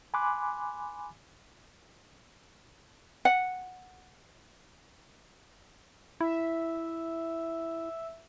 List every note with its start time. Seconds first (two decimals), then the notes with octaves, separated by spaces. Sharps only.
0.14 G#5 B5 C6 D6 F#6
3.25 F#5
6.21 E4 E5